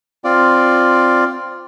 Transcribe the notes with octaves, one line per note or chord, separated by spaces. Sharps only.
C4 F4 D5